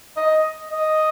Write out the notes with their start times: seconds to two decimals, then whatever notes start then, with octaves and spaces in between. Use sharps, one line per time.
0.17 D#5
0.71 D#5